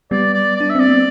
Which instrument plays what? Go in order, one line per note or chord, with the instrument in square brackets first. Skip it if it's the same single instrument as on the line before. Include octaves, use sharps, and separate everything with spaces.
[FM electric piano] G3 B3 [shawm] D5
[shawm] D5
[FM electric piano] D4 [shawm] D5
[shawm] E5
[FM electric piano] C4 [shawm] D5
[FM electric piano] B3